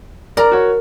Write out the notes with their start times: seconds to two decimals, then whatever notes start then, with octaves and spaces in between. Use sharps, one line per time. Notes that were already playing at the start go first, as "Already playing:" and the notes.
0.37 A#4 D5 A#5
0.52 F#4 C#5